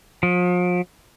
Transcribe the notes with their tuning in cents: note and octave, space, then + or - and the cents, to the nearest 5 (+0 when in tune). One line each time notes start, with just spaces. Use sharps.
F3 +40